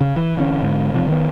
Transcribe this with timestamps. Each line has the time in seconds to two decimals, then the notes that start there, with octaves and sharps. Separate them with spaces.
0.01 C#3
0.16 E3
0.37 D3 E3 A#3 C#4
0.62 G#2 D3
0.92 E1 C3 F3
1.08 D#3 B3